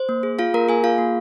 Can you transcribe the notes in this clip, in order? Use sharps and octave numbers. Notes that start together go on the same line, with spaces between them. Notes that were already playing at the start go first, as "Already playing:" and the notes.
Already playing: C5
A#3
G#4
F4 G#4 F5
A#3 A#4 A#5
A#3 G#4 G#5
F4 G#4 F5
A#3